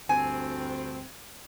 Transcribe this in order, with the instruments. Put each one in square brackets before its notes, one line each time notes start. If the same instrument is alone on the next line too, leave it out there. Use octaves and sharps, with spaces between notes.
[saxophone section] D2 G2 C4 [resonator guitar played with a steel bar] G#5